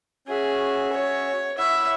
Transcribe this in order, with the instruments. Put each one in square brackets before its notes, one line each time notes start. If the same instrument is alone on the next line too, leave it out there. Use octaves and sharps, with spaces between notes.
[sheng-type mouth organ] C#4 F#4 E5 [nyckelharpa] G#4
[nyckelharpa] C#5
[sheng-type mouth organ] E4 C#5 F#5 [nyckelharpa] E5